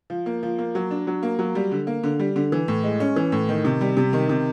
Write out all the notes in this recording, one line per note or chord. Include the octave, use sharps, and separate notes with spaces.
F3
A#3
F3
A#3
F#3
D4
F#3
A#3
F#3
G3
D3
A#3
D3
G3
D3
E3
A2
G#3
C#4
E3
A2
D#3
C3
G3
C3
D#3
C3